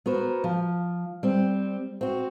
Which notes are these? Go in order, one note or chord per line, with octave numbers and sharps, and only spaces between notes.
B3 F#4 A#4 C5
F3
G3 C4
C4 F#4